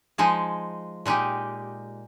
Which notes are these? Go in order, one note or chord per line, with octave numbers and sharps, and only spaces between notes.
F3 G#3 D#4 G#4
A#2 G#3 D#4 G4